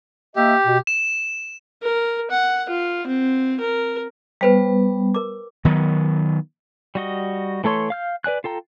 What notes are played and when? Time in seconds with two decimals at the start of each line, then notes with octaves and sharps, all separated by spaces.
0.36 A#3 G4 D#5 E5
0.66 B2
0.87 E7
1.83 A#4
2.31 F#5
2.69 F4
3.07 C4
3.60 A#4
4.41 G3 B3 B4 C5 G5
5.14 A#4 D6
5.65 D#3 F#3 B3
6.95 G3 F#4 D#5
7.64 E3 A3 A4 C#5 C6
7.90 F5 F6 G6
8.24 B4 D5 G#5 F#6
8.44 F4 A4 G5 A#5